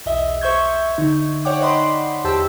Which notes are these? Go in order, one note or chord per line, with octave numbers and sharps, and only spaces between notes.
B1 E2 D#5 E5
C5 E5 C#6 G6 G#6
D3 D#4
C#5 D5 F#5 G5 D6
C5 D5 D#5 F#5 B5 C6
E2 G4 C5 G5 A5 E6